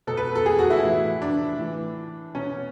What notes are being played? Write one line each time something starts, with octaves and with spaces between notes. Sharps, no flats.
B2 A4
B4
A4
G#4
F#4
E4
A2 E3
D4
A2 E3
B2 C#4